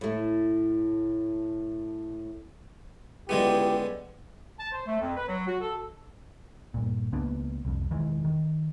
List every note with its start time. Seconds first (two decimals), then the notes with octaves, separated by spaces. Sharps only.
0.01 A2 A3
3.29 C#2 D3 G#3 B3 E4 G4
4.59 A5
4.72 C5
4.86 A3
5.01 F2
5.16 B4
5.28 F#3
5.47 F#4
5.61 A4
6.74 G2 A#2
7.13 C#2 A#3 B3 D4
7.65 C2 F2
7.91 E1 D#3 E3 G#3
8.25 D#3